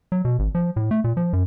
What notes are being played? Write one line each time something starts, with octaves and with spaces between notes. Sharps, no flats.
F#3
B2
G#1
F3
A2
A3
A#2
F3
F#2